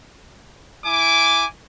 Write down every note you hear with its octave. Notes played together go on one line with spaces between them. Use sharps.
E4 G#5 D6